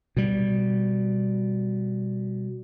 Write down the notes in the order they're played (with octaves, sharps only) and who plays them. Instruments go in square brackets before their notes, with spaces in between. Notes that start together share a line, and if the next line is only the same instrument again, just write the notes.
[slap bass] B2 G3